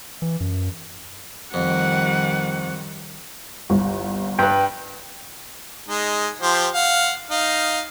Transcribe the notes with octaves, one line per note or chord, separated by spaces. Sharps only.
E3
F#2
F2 D#3 G3 F#5
G1 C2
G2 B4 G5
G#3 D#4
F3 G4 C5
F5 F#5
D#4 F5